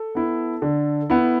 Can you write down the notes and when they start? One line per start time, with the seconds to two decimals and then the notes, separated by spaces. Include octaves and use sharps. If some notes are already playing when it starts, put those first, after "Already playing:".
Already playing: A4
0.15 B3 E4
0.62 D3
1.10 B3 E4